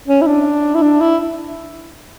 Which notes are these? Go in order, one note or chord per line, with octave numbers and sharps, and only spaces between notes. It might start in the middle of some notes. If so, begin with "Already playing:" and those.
C#4
E4
D4
E4
D4
E4